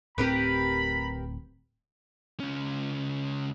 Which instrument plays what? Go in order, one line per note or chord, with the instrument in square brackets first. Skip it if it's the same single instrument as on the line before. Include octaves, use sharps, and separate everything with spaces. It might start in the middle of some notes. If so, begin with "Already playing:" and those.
[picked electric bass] D1 A2 C4 [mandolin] G4 A#4 B4 [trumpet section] A#5 B5
[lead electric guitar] C#2 C#4